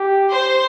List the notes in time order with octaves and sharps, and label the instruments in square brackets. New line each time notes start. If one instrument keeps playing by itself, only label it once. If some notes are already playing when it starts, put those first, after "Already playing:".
Already playing: [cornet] G4
[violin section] C5